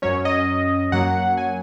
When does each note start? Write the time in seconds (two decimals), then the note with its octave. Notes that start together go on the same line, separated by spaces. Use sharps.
0.02 F#2 F#3 C#4 C#5
0.25 D#5
0.92 F#2 F#3 A#3 F#5
1.37 G#5